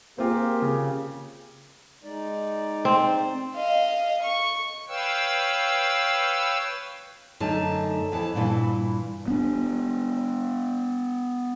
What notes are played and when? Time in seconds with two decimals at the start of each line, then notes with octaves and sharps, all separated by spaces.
0.18 A#3 C4 F4 G4 G#4
0.62 C#3
2.04 G#3 D#4 D5
2.85 C4
3.55 D#5 F5
4.22 C#6
4.88 B4 C#5 F5 G5 E6
7.40 F#2 D3 A3 D#4 A5
8.12 F2 E3 A5
8.35 G2 A#2 D3 E3
9.28 B3 D4